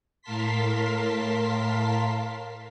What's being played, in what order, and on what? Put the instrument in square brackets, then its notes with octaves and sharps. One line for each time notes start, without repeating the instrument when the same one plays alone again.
[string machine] A2 A#4 F5 A5 C6 B6